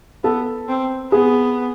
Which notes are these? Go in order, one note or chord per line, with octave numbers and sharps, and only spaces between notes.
B3 A4
C4
B3 G#4